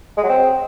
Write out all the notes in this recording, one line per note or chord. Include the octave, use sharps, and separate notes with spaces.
G#3
F#3
C4